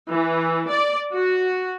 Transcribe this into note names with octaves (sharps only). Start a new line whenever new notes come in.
E3
D5
F#4